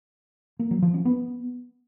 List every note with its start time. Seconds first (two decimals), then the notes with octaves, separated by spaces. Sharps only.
0.59 A#3
0.71 F#3
0.82 F3
0.94 C#4
1.05 B3